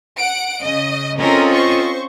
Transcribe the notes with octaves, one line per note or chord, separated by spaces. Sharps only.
F#5 D7
C#3 D#5
C4 C#4 F4 A4 A#4 D#5
C5 C#6